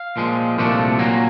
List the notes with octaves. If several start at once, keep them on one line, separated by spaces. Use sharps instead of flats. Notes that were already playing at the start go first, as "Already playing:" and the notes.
Already playing: F5
A#2 F3 G#3
C2 A#2 F3 A3 D4
A#2 F#3 A#3